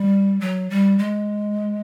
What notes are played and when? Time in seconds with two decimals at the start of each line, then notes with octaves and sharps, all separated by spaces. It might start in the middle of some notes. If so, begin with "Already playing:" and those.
Already playing: G3
0.41 F#3
0.70 G3
0.99 G#3